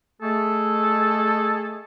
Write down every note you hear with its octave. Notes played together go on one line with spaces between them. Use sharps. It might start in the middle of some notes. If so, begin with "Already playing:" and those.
G#3 A3 G#4 A4